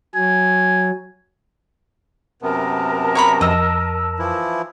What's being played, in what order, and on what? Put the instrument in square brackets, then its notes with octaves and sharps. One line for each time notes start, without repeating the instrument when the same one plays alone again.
[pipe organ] F#3 [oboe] G#5
[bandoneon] F#2 C3 B3 [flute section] A#4 A5
[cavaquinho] C#5 A#5 B5
[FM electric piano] F2 E6 [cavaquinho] D#5
[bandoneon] E3 F3 E4